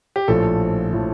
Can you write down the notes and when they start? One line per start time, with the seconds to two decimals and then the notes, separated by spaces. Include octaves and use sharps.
0.16 G4
0.28 A#1 A2 F3 A4
0.92 A2 F3